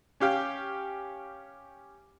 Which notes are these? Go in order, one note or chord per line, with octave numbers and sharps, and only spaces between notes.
C#4 G4 F5 G5